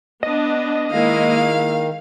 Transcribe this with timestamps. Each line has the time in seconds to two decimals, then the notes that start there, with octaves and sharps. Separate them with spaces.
0.23 B3 D4 D#5
0.91 D#3 G#3 A#3 E4 F5